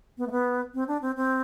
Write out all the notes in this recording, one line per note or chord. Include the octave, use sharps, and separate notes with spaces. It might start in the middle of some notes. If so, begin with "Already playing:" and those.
B3
A3
B3
C4
D4
C4
C4